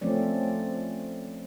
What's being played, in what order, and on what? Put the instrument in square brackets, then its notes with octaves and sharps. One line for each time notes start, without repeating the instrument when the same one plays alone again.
[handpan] F3 A3 C4 C#4 D5